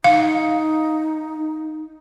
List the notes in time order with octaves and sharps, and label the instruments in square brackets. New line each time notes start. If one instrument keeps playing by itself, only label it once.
[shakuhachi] D#4 [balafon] F5